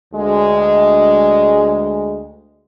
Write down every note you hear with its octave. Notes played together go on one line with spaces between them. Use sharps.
D2 G#3